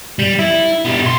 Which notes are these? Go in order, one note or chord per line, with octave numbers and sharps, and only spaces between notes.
G3
E4
G3 B3
B2 C6